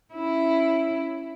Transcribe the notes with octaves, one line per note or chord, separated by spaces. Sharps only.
C#4 E4